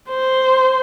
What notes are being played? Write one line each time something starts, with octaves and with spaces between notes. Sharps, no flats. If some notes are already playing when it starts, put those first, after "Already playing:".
C5